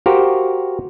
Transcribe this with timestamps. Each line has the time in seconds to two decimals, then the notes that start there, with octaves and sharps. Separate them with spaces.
0.06 F#4 G4 A#4 C5 F5